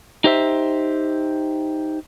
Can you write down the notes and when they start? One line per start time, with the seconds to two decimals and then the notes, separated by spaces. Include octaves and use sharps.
0.24 D#4 G4 C5 E5